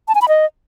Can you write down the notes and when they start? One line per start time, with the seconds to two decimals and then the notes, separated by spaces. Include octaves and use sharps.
0.08 A5
0.15 G#5
0.22 B5
0.28 D#5